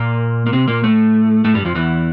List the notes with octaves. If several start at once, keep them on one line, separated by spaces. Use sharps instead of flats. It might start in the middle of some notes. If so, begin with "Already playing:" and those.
Already playing: A#2 A#3
A#3
C3 C4
A#2 A#3
A2 A3
A2 A3
G2 G3
F2 F3
E2 E3